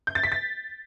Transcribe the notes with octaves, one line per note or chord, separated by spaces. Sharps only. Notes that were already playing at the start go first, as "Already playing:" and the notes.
G6
A6
B6
A6